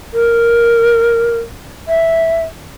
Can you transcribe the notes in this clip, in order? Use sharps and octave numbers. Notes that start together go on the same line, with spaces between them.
A#4
E5